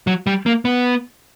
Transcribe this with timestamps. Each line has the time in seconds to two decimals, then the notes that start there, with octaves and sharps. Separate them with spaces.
0.07 F#3
0.27 G3
0.46 A#3
0.65 B3